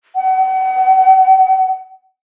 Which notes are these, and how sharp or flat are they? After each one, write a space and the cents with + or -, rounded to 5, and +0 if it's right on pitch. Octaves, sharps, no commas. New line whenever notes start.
F#5 +35